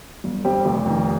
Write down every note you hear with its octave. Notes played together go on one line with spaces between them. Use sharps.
G1
G2 G3 C4 G4
F1
F2 D#3